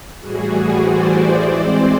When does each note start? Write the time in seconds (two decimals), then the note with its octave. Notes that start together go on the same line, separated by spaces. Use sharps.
0.20 A2 E3 G3 F#4 G#4
0.77 C5 D5
1.06 C5 D5
1.35 E3 G#3 C4 C5 D5